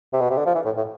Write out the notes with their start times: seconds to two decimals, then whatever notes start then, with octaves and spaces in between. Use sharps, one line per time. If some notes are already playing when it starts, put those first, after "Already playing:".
0.13 C3
0.20 B2
0.30 C3
0.37 D3
0.46 F3
0.55 E3
0.65 A2
0.77 A2